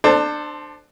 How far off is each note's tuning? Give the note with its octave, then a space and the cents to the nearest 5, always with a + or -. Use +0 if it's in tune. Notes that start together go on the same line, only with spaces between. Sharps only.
D4 +25 A4 +0 C5 +0